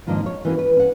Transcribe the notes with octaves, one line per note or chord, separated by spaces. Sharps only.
F2 G#2 D#3 F3 A#3 D4
C#5
E3 A#3 C#4 F#4
B4
C#4 F#5